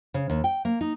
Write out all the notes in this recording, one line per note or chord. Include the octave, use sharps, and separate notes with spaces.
C#3
D#2
G5
A#3
D#4